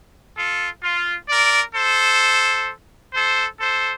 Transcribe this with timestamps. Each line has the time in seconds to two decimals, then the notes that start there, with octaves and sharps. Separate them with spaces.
0.37 F4 A4
0.83 F4
1.29 A#4 D5
1.75 A4 C5
3.14 A4 C5
3.60 A4 C5